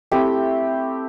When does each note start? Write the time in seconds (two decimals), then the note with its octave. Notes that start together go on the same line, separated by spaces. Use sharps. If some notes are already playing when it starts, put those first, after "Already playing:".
0.11 A3 C4 E4 G4 G5